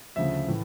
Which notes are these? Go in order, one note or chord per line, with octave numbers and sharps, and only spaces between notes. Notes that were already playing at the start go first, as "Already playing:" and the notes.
D2 C#3 F3 E5
A2 E3 A3